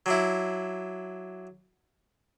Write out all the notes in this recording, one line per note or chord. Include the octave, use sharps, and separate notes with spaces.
F#3 D4 E4